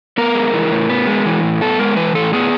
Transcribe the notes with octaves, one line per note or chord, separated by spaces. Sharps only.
B3 A#4
G#3
E3
A2
B3
G#3
E3
A2
B3 A4
G#3 A#4
E3 B4
A2 A4
B3 G#4